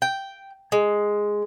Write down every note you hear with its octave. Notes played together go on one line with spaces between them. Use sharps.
G5
G#3